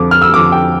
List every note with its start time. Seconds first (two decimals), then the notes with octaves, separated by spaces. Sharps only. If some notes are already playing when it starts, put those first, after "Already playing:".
Already playing: F2 D3 F3 D6
0.11 F6
0.22 E6
0.33 F2 D3 F3 D6
0.52 G5